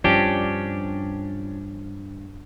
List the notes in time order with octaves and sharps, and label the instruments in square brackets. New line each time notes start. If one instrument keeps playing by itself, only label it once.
[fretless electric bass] G2 F3 [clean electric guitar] C#4 D4 G4